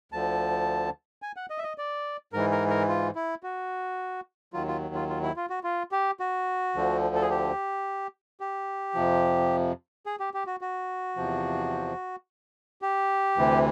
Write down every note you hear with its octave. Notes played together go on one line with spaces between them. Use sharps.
D2 D3 F3 A5
G#5
F#5
D#5
E5
D#5
D5
G#2 E3 A#4
A#4
A#4
F4
E4
F#4
D#2 D#3 F#3 F4
F4
F4
F4
E4
F4
F#4
F4
G4
F#4
D2 D3 F3
A4
G#4
G4
G4
F2 C3 F3
G#4
G4
G4
F#4
F#4
E2 C3 F3
G4
D2 C3 E3